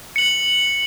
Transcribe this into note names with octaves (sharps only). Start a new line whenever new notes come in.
C#7 F#7